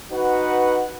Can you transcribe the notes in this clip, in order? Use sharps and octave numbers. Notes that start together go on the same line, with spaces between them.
D#4 F#4 B4 F#5